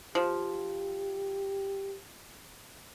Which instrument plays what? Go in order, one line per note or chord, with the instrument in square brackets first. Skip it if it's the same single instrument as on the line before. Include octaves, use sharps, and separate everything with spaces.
[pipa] F3 [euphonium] G4